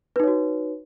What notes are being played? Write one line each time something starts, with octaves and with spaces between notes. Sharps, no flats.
D#4 F#4 B4 C#5